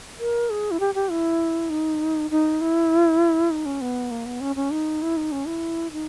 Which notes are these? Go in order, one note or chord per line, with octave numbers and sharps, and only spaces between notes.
A#4
G#4
E4
G4
G4
E4
D#4
D#4
E4
D#4
C#4
B3
A#3
B3
C#4
C#4
D#4
E4
D#4
C#4
E4
D#4